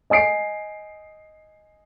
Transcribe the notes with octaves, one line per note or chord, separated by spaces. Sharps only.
D#5 G#5 D#6 C7 D7